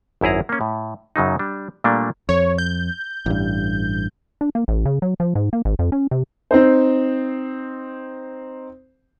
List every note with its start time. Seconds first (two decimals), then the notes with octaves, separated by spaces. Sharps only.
0.21 G#1 F#2 E4 G#4 A#5
0.49 A#3 C#4
0.61 A2
1.16 F#2 C#3 F#3 D#4
1.39 G3 D4
1.84 A#2 G3 A3 A#3 D4
2.29 F2 C#5
2.58 G6
3.26 A1 G2
4.41 D4
4.55 A#3
4.68 A1
4.85 C#3
5.02 F#3
5.20 F3
5.35 G#2
5.53 A#3
5.65 G#1
5.79 F2
5.92 C#4
6.11 C3
6.51 C4 D#4 C5